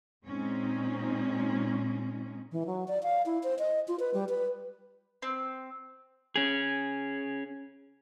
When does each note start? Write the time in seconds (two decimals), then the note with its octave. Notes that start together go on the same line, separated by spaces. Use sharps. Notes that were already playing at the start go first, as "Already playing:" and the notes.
0.24 A#2 G#3 C4 C#4 D#4
2.52 E3
2.67 F#3
2.88 D5
3.03 F5
3.26 E4
3.43 C5
3.59 D#5
3.88 F4
4.00 B4
4.14 G3
4.29 B4
5.22 C4
6.36 C#4 G#4